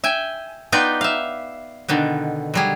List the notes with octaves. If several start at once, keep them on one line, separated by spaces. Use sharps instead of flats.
E5 G5 G#5
B3 D#4 F4 B4 D5 G5
E5 F5
B2 D3 D#3 B3
F#3 G3 G#4